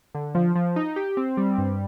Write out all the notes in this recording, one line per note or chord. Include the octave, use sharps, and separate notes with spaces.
D3
F3
F3
D#4
G4
C4
G3
G2